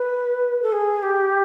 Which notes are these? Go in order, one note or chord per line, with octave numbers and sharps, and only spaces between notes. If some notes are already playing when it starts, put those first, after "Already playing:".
Already playing: B4
A4
G#4
G4